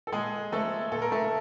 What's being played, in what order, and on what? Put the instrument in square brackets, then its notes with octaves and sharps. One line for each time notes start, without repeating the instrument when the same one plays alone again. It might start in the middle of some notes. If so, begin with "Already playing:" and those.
[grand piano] A4
A#2 G#3 G#4
F3 A3 A#3 A4
A#2 A4
A#4
A3 A4